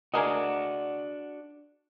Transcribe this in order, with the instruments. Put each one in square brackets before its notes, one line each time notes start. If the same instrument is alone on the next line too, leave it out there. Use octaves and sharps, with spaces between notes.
[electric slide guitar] D4 F#4 [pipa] G#4 A#4 D#5